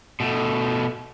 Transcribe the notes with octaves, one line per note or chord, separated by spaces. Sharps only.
B2 A3